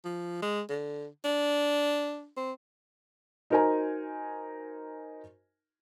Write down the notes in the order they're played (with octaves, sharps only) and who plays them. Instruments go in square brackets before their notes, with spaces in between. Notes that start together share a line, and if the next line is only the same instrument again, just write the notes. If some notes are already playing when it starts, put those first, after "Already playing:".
[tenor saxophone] F3
G#3
D3
D4
C4
[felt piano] D#4 F#4 A#4 C5 G#5 A#5